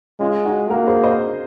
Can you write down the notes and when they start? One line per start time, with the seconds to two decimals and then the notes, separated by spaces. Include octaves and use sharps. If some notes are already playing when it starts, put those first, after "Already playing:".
0.20 G#3 C#4 F4
0.45 D#4 F#4
0.70 A#3 F#4 A#4
0.87 G#4 C5
1.03 C5 D#5